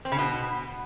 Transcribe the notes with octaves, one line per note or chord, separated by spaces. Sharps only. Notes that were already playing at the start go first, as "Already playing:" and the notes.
C4
C#3
B2